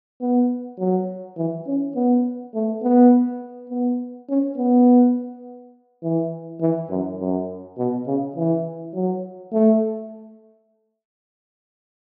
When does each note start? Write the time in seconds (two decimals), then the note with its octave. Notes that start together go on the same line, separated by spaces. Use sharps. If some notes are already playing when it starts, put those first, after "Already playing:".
0.21 B3
0.79 F#3
1.37 E3
1.67 C#4
1.96 B3
2.54 A3
2.83 B3
3.70 B3
4.29 C#4
4.57 B3
6.03 E3
6.61 E3
6.90 F#2
7.20 F#2
7.78 B2
8.07 C#3
8.36 E3
8.94 F#3
9.53 A3